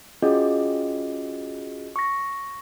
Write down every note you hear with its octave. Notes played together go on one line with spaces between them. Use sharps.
C#4 F4 F#4 G#4 D#5
C#6 A#6